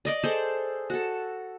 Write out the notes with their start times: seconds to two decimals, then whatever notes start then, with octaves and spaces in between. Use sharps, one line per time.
0.05 D5 D#5 D6
0.23 G#4 A4 C5 D5
0.90 F#4 A4